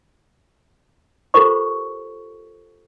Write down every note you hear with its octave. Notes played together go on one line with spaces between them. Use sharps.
F4 G4 A4 A#4 C5 C#6